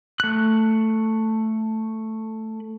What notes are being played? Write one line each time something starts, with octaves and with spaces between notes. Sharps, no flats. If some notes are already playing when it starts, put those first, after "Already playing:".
A3 F#6